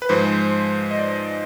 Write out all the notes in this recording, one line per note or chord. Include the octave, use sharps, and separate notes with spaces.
B4
G#2 F3 G#3 C5
D#5
D5